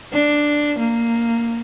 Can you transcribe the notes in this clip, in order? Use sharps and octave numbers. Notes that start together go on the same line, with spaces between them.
D4
A#3